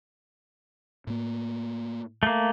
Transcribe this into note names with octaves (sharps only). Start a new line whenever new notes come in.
A2 A#3
A3 A#3